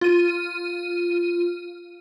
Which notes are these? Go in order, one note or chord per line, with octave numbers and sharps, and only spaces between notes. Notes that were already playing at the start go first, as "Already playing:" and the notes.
F4 D#7